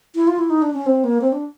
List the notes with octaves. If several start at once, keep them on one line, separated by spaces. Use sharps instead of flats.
E4
F4
E4
D#4
D4
C#4
C4
A#3
C4
D4